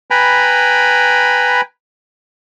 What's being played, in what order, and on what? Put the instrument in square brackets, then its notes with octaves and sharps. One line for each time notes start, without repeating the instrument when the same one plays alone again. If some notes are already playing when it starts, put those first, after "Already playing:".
[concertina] B4 G5 G#5 A#5 B5